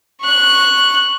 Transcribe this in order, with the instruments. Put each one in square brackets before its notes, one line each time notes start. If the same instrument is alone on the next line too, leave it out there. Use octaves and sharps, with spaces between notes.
[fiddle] C#6 F#6